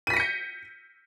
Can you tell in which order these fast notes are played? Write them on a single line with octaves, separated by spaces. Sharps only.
D#7 B6 A#6 C#7 G6